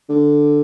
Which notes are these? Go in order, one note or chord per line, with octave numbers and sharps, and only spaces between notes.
D3